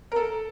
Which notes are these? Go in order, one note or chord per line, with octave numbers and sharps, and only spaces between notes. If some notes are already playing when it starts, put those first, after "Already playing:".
A#4
A4